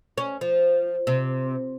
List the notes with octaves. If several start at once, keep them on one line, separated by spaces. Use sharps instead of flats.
C#4
F3
C3